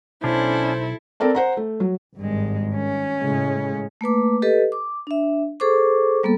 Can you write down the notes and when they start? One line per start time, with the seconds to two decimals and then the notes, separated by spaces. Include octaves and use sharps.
0.24 B1 C#4 D4 E4 A4 C5
1.20 C4 A4 A#4 D5 A5
1.35 C5 F#5 A#5
1.57 A3
1.80 F#3
2.17 G#1 G2 G#3
2.76 C#4
3.20 A2 C#3 G#3
4.01 A3 A#3 B4 D6
4.42 G4 A4 B4 D#5
4.72 D6
5.07 D4 E5
5.60 G#4 A4 C5 C#6 D6
6.23 G3 A#3 B3 A4